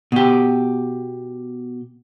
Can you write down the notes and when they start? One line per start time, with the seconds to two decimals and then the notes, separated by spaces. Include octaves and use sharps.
0.12 B2 G4